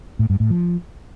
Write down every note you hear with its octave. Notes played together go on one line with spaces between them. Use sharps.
A2
G2
A2
F3